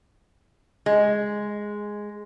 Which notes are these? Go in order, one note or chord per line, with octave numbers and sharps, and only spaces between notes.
G#3